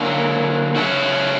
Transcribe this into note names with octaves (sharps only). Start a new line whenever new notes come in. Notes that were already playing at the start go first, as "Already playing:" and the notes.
Already playing: D3 F#3 A#3
C#3 F#3 A3 C#4 F#4